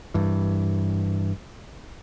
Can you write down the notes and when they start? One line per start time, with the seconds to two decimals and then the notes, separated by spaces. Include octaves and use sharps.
0.14 G2 E3